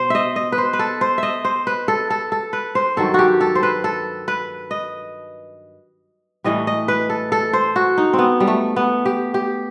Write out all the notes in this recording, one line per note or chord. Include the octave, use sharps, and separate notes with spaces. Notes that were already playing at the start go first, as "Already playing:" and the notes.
Already playing: B2 C5
D#5 E5
D#5
B4
C5
B4
A4
C5
D#5 E5
C5
B4
A4
A4
A4
B4
C5
G2 D#3 F#3 A4
F#4 G4
A4
C5
B4
A4
B4
D#5
A2 E3 G3 D#5
D#5
B4
A4
A4
C5
F#4
D#4
C4
B3
G3
A3
B3
G4
G4